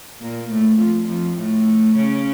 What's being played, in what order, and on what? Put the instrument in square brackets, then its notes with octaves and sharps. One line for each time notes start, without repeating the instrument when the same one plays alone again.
[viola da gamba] A#2 A#3
A2 A3
F2 F3
F2 F3
A2 A3
C#3 C#4